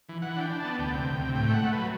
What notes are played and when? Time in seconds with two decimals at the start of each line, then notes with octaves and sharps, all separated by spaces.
0.09 E3
0.22 E3 F#5
0.37 D4 G5
0.50 D4
0.60 A5
0.65 B3
0.79 D2 G5
0.93 C3
1.06 D2
1.21 C3
1.35 A2 G5
1.50 A3 F#5
1.63 A3
1.73 B4
1.78 F#3